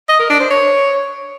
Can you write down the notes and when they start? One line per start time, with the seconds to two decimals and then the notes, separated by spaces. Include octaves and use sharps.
0.09 D#5
0.19 A#4
0.30 D4
0.40 C5
0.50 C#5